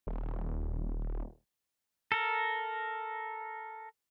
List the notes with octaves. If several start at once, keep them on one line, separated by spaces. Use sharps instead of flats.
D#1
A4 A#4